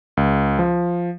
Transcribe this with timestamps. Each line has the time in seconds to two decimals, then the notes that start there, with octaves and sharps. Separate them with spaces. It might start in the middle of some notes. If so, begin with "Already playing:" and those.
0.17 C#2
0.59 F3